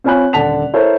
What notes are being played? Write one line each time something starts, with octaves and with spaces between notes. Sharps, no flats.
C4 F4 C#5 G#5 B5 F#6
D#1 D3 F#5 A5 B6 F7
E4 A4 A#4 C5 C#5